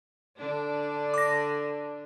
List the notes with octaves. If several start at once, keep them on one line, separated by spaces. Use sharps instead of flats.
D3 D4
D6 A#6